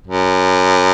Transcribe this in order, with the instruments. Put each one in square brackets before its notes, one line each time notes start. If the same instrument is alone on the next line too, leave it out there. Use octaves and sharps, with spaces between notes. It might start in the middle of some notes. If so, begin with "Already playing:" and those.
[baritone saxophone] F#2